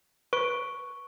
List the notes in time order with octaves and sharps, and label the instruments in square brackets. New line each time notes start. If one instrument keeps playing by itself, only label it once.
[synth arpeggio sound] B4 [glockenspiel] C#6 D7